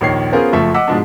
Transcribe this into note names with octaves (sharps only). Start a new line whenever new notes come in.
A#1 D#2 D#3 C#5 C7
B3 C#4 F4 G#4 A#4 C5
F#1 F3 A3 E5 C#6
D#5 F#5 D6 E6 B6
G#2 B2 F3 G#3 D4